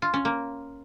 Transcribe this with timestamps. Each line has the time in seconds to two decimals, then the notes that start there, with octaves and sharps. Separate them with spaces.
0.02 F4
0.14 C#4
0.25 A#3